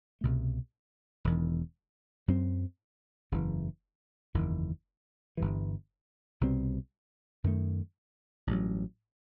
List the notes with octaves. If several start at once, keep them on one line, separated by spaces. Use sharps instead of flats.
C2 B2 A3
E1 E2 D#3
F#2 F#3 C4
F#1 E2 C3 E3
F#1 E2 D#3
G1 G2 E3
C2 B2 G3 C4
F#2 D#3 A3
A1 G2 F#3